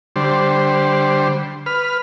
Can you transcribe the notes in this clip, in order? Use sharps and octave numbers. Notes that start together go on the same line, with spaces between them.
D3 G3 C5
B4 F6